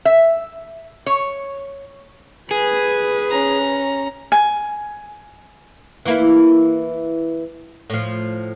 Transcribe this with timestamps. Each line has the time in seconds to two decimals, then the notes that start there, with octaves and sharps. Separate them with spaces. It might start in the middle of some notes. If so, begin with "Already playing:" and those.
0.05 E5
1.06 C#5
2.51 G#4 B4
3.30 C#4 A#5
4.32 G#5
6.05 E3 A#3 E4
7.90 A2 F3